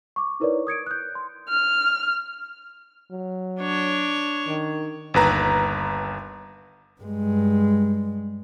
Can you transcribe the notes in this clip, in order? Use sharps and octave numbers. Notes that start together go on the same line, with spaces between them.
C#6 D6
D#4 E4 A#4 B4 C#5 D5
D#6 G#6 C#7 D7
F#6 G6
C6
F6
F#3
D4 C#5
D#3
G1 D#2 B4 A#5
G2 G#3